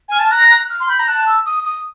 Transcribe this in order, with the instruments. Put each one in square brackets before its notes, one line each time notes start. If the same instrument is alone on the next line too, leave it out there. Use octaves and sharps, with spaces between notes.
[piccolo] G#5 [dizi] F6
[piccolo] A5
[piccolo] A#5 [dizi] F#6
[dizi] F#6
F6
[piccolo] C6
[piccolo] B5 [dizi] G6
[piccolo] A#5
[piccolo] A5 [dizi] F#6
[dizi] E6
D#6
D#6